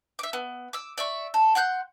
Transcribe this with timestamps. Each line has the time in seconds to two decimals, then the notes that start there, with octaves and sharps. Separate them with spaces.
0.19 E5 D6
0.33 B3
0.73 D6 E6
0.98 D5 E5 C#6
1.34 A4
1.55 F#5 C6 F#6 G6